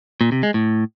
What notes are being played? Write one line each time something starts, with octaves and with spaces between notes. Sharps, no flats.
A#2
C3
G#3
A2